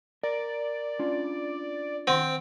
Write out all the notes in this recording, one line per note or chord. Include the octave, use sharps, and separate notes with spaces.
A#4 D5
C#4 D4 F4
D#3 C4 F#5